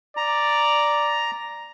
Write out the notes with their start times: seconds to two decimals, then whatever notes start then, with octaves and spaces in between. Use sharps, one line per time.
0.17 D5 A#5